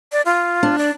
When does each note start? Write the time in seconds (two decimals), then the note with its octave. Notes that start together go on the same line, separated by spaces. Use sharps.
0.12 D5
0.25 F4
0.63 D4
0.78 D5